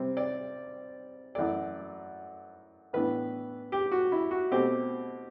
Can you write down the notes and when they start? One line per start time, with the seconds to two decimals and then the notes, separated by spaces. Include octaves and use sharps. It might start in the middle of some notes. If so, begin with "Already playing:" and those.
Already playing: C3 G3 C4
0.17 D5
1.35 F#2 E3 A3 D5
2.93 A2 E3 B3 D4 B4
3.72 G4
3.92 F#4
4.12 E4
4.31 F#4
4.51 B2 A3 C4 G4